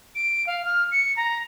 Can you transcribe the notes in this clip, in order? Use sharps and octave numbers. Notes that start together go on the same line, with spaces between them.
D7
F5
F6
C#7
A#5